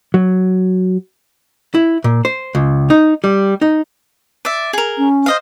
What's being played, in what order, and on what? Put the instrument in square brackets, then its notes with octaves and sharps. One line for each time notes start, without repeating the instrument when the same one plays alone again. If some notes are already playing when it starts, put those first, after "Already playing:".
[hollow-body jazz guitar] F#3
E4
A#2
C5
C#2
D#4
G3
D#4
[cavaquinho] D5 E5
G#4 A#4
[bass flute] C#4
[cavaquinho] C5 D#5 F5